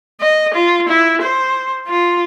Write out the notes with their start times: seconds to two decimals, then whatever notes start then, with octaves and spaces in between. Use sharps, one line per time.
0.21 D#5
0.54 F4
0.89 E4
1.22 C5
1.88 F4